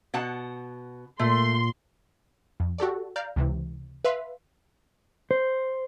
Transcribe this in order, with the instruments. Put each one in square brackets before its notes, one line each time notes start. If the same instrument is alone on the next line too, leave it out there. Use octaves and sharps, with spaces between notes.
[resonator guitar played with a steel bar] B2 F#5 A5
[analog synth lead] A#2 [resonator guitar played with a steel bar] A3 [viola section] C6
[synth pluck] F2
F#4 G4 A4 D5
D5 F5 A#5 F6 G6
C#2 C3 E3
B4 E5 F5 C6 B6
[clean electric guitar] C5